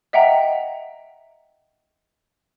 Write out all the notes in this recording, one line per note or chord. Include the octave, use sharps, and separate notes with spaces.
D#5 E5 F#5 G5 A#5